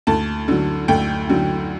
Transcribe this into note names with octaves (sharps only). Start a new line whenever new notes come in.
D2 A5
D3 F#3
D2 G5
D3 F#3